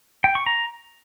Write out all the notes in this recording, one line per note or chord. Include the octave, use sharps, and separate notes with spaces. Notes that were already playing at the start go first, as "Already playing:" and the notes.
G5
C#6
A#5